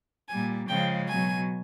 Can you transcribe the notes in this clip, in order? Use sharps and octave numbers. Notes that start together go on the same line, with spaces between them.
A#2 G3 G#5
C#3 F3 G#3 G5
B2 F#3 G#5